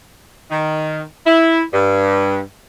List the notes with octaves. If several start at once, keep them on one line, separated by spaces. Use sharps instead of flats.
D#3
E4
G2